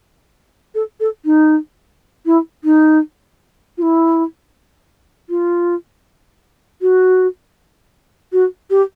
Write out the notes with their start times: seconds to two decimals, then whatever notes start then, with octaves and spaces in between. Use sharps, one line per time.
0.75 A4
1.00 A4
1.25 D#4
2.26 E4
2.64 D#4
3.78 F4
3.82 E4
5.29 F4
6.82 F#4
8.32 F#4
8.70 G4